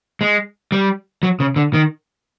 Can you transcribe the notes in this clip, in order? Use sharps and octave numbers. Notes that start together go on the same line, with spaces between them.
G#3
G3
F#3
C#3
D3
D#3